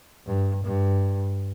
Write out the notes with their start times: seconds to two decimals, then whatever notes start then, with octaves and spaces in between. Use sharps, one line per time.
0.26 G2
0.64 G2